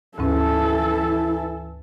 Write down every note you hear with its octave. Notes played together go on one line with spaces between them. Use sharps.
D2 G#2 E3 C#4 E4 A4